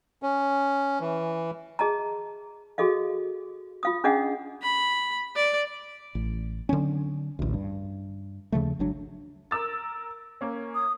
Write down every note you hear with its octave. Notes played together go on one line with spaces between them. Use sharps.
C#4
E3
G#4 D#5 A5 A#5
F#4 G#4 A4 D#5 F5
F4 F5 D#6
C#4 D4 G#4 D#5 F5 F#5
B5
D5
A1
D3 F#3 C4 C#4
A1 D2
G2
D#2 C#3 F3 A3
G#1 F#3 D4
A#4 E6 A6
A#3 C#4
D#6